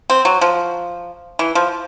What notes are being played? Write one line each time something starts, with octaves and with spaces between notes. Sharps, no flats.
C4
F#3
F3
E3
F3